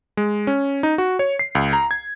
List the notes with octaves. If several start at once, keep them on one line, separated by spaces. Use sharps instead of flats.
G#3
C#4
D#4
F#4
C#5
C7
C#2
A#5
G#6